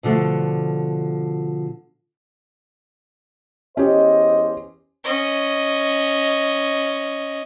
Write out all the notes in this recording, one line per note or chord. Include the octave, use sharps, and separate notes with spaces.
B2 D3 F3 A3
E2 C#4 G4 C5 D#5
C#4 D#5